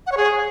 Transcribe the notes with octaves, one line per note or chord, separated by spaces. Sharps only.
F#5
C#5
G#4